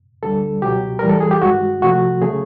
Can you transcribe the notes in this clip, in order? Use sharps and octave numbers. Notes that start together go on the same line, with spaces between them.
D2 D3 G3 A4
C#2 B2 F#3 G4
A2 E3 G3 A#4
A4
G#4
G4
G2 D#3 G#3 F#4
C2 C3 F3 A3 F#4
C#3 F#3 A3 G#4